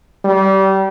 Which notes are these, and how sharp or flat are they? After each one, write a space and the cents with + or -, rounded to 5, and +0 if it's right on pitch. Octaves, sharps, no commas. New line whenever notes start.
G3 -25